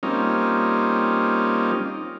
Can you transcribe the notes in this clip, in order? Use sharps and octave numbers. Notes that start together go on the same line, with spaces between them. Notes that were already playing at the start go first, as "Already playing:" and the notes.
G3 A#3 C4 C#4 D#4 F4